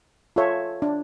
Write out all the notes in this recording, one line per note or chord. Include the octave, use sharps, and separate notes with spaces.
F4 A4 C#5 E5
D4